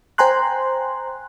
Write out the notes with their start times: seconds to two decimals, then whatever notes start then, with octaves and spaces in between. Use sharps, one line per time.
0.18 C5 G5 G#5 A#5 C6 F#6